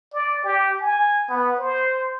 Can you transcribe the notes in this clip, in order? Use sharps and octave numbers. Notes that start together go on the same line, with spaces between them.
D5
G4
G#5
B3
C5